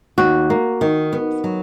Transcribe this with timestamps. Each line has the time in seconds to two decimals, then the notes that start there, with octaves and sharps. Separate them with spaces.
0.18 D#2 F#4
0.50 A#3
0.81 D#3
1.13 B3
1.44 F#3